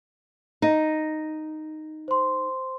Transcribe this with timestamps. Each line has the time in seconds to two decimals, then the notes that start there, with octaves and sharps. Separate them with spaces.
0.62 D#4
2.08 C5 C6